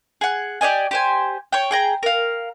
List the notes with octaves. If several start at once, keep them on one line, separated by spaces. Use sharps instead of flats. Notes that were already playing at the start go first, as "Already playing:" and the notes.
G#4 F#5
G4 D5 D#5 G#5
G4 C5 G#5
C#5 G5
G#4 G5 A#5
A#4 F5